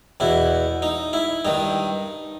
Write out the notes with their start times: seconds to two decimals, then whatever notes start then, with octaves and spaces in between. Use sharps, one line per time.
0.20 E2 B2 E4
0.82 D#4
1.13 E4
1.45 G2 D#3 D#4